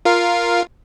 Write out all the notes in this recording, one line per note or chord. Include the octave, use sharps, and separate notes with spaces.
F4 A#4 F5